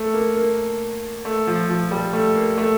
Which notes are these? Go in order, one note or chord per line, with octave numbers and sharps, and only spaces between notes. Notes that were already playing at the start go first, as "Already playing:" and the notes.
Already playing: A3
A#3
A#3
A3
F3
F3
G3
A3
A#3
A3